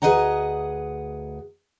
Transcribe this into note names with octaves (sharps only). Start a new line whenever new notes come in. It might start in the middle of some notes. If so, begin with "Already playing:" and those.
D2 G#4 B4 D#5 F#5 A#5